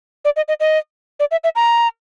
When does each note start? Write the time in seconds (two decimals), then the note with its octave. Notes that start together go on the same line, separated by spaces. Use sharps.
0.25 D5
0.36 D#5
0.48 D#5
0.60 D#5
1.20 D5
1.31 E5
1.44 E5
1.55 A#5